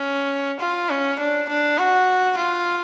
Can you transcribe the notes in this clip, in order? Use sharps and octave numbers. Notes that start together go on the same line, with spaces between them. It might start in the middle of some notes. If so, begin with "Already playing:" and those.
Already playing: C#4
F4
C#4
D4
D4
F#4
F4